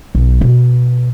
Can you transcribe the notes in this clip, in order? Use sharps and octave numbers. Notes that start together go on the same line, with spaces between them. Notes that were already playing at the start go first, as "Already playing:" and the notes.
B1
B2